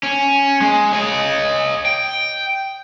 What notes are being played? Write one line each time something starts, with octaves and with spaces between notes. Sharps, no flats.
C#4
G#3
C#5 D#5
G5